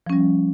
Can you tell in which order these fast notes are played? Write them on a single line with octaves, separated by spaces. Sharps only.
F3 C#4 G3